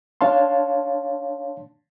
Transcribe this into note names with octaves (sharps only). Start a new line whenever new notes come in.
D4 C#5 F5 A5 C6